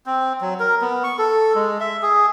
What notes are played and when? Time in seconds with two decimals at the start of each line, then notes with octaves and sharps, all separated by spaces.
0.06 C4
0.41 F#3
0.60 A#4
0.81 B3
1.04 C#6
1.18 A4
1.55 G#3
1.80 E5
2.02 G#4